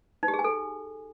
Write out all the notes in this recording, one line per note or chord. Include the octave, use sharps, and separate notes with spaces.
D#4
G4
G#4
G#5
A4